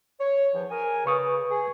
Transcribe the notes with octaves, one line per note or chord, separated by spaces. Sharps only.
C#5
E2 F3
G#4 A#4 G#5
C#3 B4 C#6 D#6
G#4